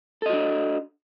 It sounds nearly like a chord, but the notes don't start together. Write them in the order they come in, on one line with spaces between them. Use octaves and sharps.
A4 D#5 F#4 D4